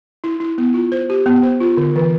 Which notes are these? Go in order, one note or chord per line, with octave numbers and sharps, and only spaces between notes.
E4
E4
B3
F4
C5
G4
B3
C5
F4
D3
E3